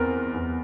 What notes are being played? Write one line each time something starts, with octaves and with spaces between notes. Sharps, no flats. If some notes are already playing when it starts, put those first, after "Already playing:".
Already playing: E2 C4 A#4
E2